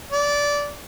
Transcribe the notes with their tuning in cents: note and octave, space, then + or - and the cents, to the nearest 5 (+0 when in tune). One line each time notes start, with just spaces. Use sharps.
D5 -15